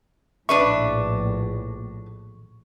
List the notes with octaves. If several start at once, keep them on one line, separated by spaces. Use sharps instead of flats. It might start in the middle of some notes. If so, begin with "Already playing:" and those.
A#1 A2 D4 B4 E5 C#6